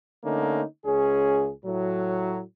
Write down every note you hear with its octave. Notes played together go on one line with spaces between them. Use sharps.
D3 A3 A#3 C#4 D#4
C#2 C#4 G#4
A2 F#3